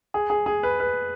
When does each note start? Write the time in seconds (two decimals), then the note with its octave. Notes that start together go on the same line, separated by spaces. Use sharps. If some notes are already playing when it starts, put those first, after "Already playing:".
0.14 G#4
0.30 G#4
0.46 G#4
0.63 B4
0.80 B4